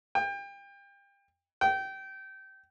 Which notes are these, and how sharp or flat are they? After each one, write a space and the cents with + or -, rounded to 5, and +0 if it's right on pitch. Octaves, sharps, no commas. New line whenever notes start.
G5 +30
G5 -25